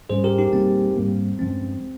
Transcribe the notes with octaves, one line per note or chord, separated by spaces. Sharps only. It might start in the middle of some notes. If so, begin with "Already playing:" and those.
G#2 G3 C#4 G#4 C5
G4 A#4
D#4 G4
A#2 G3 A#3 C4
G#2 G3 A#3
G2 F3 G#3 C4 C#4